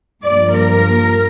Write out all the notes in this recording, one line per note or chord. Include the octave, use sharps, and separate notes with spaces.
G2 F3 A#3 D5
A#4